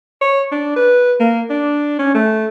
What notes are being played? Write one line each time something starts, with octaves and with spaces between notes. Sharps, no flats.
C#5
D4
B4
A#3
D4
C#4
A3